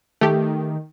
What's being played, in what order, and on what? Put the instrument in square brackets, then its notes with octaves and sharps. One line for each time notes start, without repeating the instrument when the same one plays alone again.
[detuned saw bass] D#3 [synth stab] A3 G4